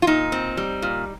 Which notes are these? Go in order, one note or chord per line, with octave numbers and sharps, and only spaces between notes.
F4
A#2 D#4
C4
G3
A#2